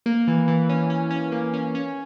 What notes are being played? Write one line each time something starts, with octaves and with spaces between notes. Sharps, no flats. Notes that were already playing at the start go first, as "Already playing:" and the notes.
A#3
E3
E3
C#4
C#4
C#4
A#3
C#4
C#4